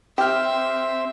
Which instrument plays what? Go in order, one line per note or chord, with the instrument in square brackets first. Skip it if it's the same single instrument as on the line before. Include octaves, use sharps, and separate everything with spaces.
[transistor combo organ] C4 [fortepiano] G4 F6 [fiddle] E5 [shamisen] G5